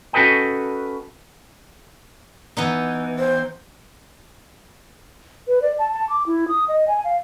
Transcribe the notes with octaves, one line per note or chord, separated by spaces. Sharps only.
C#4 F#4 A4 B4 D#5 G5
E3 B3 D#4
C5
B4
D5
A5
A5
D6
E4
D#6
D#5
G#5
F5